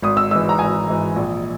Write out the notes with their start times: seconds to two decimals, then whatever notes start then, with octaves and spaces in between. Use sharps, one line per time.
0.02 G#1 D#6
0.17 E6
0.31 G#2 E3 E6
0.49 A#5
0.59 G#1 G#5
0.87 G#2 E3
1.16 A#1